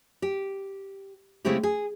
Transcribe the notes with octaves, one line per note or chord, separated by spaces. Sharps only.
G4
C#3 G#3 A3 C4 E4 G4
G#4